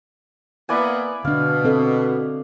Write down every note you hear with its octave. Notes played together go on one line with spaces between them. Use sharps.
A#3 B3 E4 D5 G#5
B2 D3 D4 F5
C4 A4 D#5